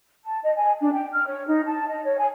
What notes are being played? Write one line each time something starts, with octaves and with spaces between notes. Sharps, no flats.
A5
D#5
G#5
D4
G5
F6
C#5
D#4
A5
D#5
C#5
G#5